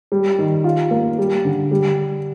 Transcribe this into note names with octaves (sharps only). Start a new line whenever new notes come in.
G3
D#3
F4
A#3
G3
D3
G3